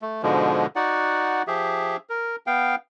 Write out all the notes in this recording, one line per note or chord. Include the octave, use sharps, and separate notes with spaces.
A3
G#2 B2 D3 F3 G#3
D#4 F#4 D5 F#5
F3 G4 G#4 E5
A#4
B3 F5 G5